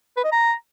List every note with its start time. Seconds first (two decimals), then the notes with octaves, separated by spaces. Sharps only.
0.17 B4
0.24 D#5
0.32 A#5